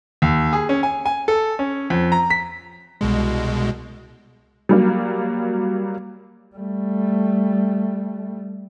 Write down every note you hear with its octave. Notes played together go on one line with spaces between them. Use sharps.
D#2
G#4
C#4
G#5
G#5
A4
C#4
F2
A#5
B6
C2 B2 G#3
F#3 G3 A#3
G3 A3